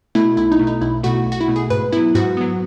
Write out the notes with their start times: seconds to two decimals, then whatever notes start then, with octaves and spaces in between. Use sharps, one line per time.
0.15 B2 A3 E4
0.37 B1 E4
0.52 D#4
0.59 B2 A3
0.67 D#4
0.81 B1 E4
1.03 B2 A3 F#4
1.26 B1
1.32 F#4
1.41 E4
1.48 B2 A3
1.56 G#4
1.70 G#2 B4
1.92 F#3 B3 E4
2.15 G#2 F#4
2.37 F#3 B3